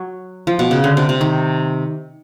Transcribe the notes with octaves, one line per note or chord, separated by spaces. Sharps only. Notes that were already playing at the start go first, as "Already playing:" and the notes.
Already playing: F#3
F3
B2
C#3
D3
C3
C3
D#3